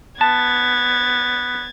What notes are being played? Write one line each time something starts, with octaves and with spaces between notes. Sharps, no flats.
B3 A5 G#6 A6